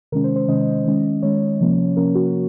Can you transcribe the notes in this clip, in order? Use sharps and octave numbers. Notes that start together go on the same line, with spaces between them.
C3 D#3 G#3 C#4 A#4
C5
C5
C3 D#3 G#3 C#4 D#5
D#3 G#3 C#4
D#3 G#3 C#4 C#5
C3 F3 A#3 C#4
C3 F3 A#3 C#4 A#4
F#4